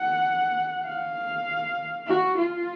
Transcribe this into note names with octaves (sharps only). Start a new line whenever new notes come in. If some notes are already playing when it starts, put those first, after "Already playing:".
Already playing: F#5
F5
F#4
F4